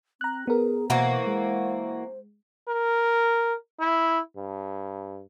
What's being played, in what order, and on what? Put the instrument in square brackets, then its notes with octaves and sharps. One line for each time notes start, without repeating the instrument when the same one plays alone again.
[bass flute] C4 [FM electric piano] A#5 F#6
[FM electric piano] B3 A#4 [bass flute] G#4
[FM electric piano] B2 [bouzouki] E3 A#3 F#4 [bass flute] C5
[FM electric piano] G#3
[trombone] A#4
E4
G2